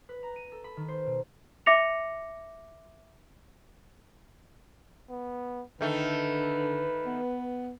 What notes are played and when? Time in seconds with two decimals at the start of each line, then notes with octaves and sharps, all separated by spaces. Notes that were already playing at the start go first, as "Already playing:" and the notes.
0.09 B4
0.23 A#5
0.36 D#7
0.52 A4
0.64 B5
0.77 D#3
0.88 C5
1.06 B2
1.66 E5 D6 A#6 C#7 F7
5.09 B3
5.81 D3 D#3 A3 B4
7.06 B3